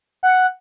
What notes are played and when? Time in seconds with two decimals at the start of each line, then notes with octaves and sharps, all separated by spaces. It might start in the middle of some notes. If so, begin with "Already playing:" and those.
0.23 F#5